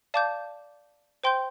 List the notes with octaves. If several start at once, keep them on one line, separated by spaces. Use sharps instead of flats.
D5 F5 A5 D6 G6
C5 G5 C6 G6